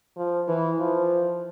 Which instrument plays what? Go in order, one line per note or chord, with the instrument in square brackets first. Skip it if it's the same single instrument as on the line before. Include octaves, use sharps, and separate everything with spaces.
[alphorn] F3
E3
F3